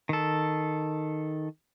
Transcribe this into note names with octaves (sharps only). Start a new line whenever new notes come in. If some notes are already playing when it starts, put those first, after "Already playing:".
D#3 A4